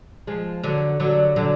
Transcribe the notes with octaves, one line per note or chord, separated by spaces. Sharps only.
F3 G#3
D3 F#3
D3 F#3
D3 F#3